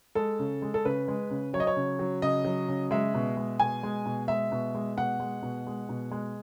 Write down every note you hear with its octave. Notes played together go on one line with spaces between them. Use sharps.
G#3 A4
C#3
G#3
A4
C#3 B4
G#3
C#3
F#3 C#5
D#5
C#5
C#3
F#3
C#3 D#5
F#3
C#3
G#3 E5
B2
G#3
B2 G#5
G#3
B2
G#3 E5
B2
G#3
B2 F#5
G#3
B2
G#3
B2
G#3